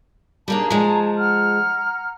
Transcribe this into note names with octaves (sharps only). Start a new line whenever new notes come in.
G3 A#3 D4 G#4 A5 A#5
F3 G#3
F#5 A#5 F6